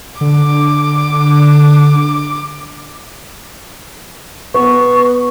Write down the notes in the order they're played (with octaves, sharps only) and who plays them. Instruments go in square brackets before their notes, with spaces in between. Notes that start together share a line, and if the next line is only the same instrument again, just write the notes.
[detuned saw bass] D3 [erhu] D6
[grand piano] B3 [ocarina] C#6